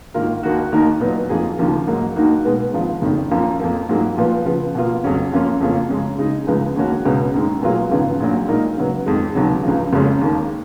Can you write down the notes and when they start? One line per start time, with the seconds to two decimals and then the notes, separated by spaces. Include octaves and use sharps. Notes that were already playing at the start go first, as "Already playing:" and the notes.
0.14 G#2 D#3 A#3 F4 A#4
0.43 D#2 D#3 A#3 D#4 F#4
0.72 D#2 D#3 A#3 D#4 A#4
1.01 A#2 F#3 B3 D#4
1.30 F2 F3 A#3 D#4 G#4
1.59 D#2 C#3 F3 A#3
1.87 G#2 F#3 A#3 D#4 A#4
2.16 D#2 D#3 A#3 D#4 F#4
2.45 B2 G#3 B3
2.73 G#1 G#2 F3
3.02 F#1 F2 D#3
3.31 F#2 F3 A#3
3.60 F2 F3 A#3
3.89 G#2 F#3 A#3 F4 G#4
4.17 A#2 F3 B3 F4
4.46 C#3 F3 B3
4.75 B2 A#3 F4
5.04 F2 C#3 F#3 C#4
5.32 F#2 F3 A#3 C#4 F4
5.61 F2 C#3 F3 A#3 C#4
5.90 F#2 C#3 G#3
6.18 C#3 G#3 D#4
6.47 C#2 C#3 F3 G#3 B3
6.76 D#2 D#3 A#3 C#4 F#4
7.05 C#2 B2 G#3 C#4
7.34 F#2 D#3 G#3
7.62 B2 F#3 A#3 F4 G#4
7.91 G#1 F#2 C#3 F3 B3
8.20 A#1 A#2 F#3
8.48 A#2 G#3 D#4 A#4
8.77 C#3 F#3 B3
9.06 F2 D#3 G#3
9.35 F1 D#2 C#3 F#3
9.63 C#2 C#3 F3
9.93 F#1 F2 C#3 G#3 C#4
10.21 D#2 D#3 A#3